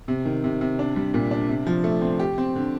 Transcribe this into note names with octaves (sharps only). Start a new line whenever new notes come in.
C3
D#3
C3
C3
D4
G3
A#2
D4
C3
F3
A3
C4
G4
C4
D3